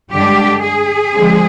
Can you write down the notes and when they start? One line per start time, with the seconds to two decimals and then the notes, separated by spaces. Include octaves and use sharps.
0.12 G2 D3 G#3 D4 G4
0.62 G#4
1.11 D3 F3 G#3 C4